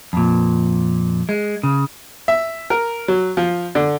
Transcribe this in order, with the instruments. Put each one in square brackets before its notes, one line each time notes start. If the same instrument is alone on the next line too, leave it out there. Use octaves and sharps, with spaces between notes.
[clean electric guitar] F2 A#2
G#3
C#3
[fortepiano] E5
A#4
F#3
F3
D3